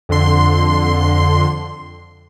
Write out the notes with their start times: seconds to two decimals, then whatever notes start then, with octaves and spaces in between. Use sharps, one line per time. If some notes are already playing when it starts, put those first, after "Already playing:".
0.09 F2 D3 C6